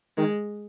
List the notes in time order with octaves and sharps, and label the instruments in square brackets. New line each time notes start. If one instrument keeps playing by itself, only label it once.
[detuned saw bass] D#3 [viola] G#3